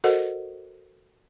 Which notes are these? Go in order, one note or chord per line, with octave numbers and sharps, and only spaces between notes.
F#4 A4 A#4 C5 D#5 F#5